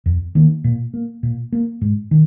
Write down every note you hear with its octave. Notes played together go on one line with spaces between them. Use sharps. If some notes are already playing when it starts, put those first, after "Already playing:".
F2
D#3 A#3
A#2
A#3
A#2
A#3
G#2
D#3